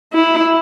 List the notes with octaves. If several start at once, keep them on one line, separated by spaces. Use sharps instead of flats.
E4